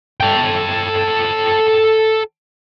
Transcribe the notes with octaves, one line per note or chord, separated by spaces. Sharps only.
A4 G5